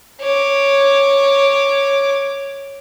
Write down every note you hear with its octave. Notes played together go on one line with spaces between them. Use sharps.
C#5 D6